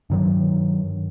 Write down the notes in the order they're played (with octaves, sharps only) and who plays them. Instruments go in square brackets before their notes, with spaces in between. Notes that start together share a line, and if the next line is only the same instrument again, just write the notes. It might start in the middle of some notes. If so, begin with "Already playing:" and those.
[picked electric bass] G2 D#3 F#3